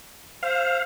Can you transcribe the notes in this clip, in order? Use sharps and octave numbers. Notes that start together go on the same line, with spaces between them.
C5 F5